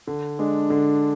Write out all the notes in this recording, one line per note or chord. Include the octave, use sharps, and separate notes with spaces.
D3
G#3 D4
D3